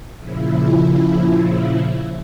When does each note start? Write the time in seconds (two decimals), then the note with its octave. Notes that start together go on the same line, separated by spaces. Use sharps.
0.19 A#2 C#3 F3 E4